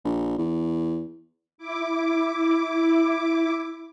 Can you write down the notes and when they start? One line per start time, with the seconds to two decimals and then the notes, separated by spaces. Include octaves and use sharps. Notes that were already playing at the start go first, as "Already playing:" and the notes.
0.05 A#1
0.38 E2
1.58 E4 D6